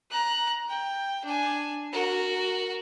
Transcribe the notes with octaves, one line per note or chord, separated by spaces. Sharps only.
A#5 F#6
G5
D4 G#5
F#4 A#4